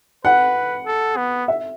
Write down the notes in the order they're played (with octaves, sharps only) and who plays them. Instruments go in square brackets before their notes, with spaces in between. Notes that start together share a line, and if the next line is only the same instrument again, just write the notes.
[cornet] B4 [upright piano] F#5
[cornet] A4
B3
[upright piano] E5